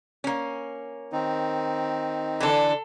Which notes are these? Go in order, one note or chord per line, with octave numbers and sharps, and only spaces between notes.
A#3 C#4
D#3 C4 D#4
D3 E3 A4